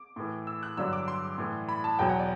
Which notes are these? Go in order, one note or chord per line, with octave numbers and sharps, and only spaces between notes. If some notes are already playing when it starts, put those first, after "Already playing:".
Already playing: D6
A2 E3
E6
F#6
G2 D3 F#3 E6
D6
C6
A2 E3
B5
A5
E2 B2 F#3 G5
F#5
D5